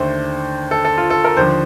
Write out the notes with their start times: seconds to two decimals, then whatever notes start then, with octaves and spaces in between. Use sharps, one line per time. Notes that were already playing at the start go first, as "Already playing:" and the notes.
Already playing: D#2 D3 A3 C5
0.71 A4
0.85 A4
0.98 F4
1.10 A4
1.24 A#4
1.37 D#2 D3 F3 C5